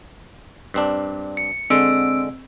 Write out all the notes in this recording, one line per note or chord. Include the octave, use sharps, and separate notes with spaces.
G2 C4 D4
C#7
D3 G#3 C4 E6 D7